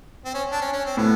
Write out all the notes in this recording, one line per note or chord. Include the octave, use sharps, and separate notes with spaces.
C4
C#4
D4
C#4
C#4
C4
A2 B3